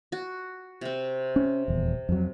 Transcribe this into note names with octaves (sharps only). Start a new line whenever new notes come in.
F#4
C3 C4
C#4
D#1 E2
F2 F#3